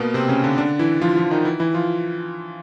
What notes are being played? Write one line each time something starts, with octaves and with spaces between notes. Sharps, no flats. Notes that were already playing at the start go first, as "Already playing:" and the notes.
Already playing: B2 A#3 B3
C3 C4
C#3 C#4
D3 D4
D3 D4
E3 E4
F3 F4
F3 F4
D#3 D#4
E3 E4
E3 E4
F3 F4